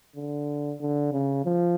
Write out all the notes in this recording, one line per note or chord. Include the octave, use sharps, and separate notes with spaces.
D3
D3
C#3
F3